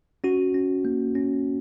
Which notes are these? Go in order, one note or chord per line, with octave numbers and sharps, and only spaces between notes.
C#4 F#4
C#4
A#3
C#4